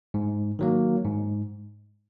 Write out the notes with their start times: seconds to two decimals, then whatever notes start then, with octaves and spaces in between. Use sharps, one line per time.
0.14 G#2
0.59 D#3 F#3 A#3
1.05 G#2